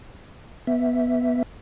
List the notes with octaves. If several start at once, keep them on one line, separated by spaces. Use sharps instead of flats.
B3 E5